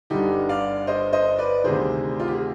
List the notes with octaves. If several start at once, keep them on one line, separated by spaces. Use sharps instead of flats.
G1 G2 D3 D#4 G4
D5 F5
C5 D#5
C5 D#5
B4 D5
D2 C3 D#3 G#4 C5
F4
G4
G#4